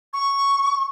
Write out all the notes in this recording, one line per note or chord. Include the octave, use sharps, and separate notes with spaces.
C#6